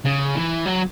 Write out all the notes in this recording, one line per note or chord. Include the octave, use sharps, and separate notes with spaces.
C#3
E3
F#3